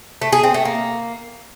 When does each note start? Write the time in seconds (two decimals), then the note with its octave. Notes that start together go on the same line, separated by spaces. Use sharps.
0.22 A3
0.32 G#4
0.43 C4
0.54 A3
0.65 A#3